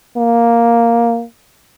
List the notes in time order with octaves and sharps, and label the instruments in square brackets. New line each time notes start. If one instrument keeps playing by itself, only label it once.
[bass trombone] A#3